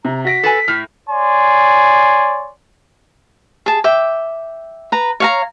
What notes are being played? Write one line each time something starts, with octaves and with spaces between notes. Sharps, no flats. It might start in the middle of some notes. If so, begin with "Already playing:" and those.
C3 A#5
F#4 A#6 B6 D7
A4 B4 G#5
A2 F6
C#5 D5 G#5 C6
G#4 A5
E5 G5 D6
B4 A#5
C#5 F5 A#5